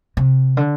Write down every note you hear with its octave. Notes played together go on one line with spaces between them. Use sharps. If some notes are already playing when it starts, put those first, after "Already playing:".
C3
D3